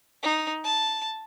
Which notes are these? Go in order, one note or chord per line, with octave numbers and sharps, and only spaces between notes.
D#4
A5